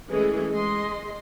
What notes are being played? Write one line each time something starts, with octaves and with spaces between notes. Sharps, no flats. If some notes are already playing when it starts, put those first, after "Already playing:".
E3 G#3 A3 C#4 G#4 A4
G#3 D#5 C6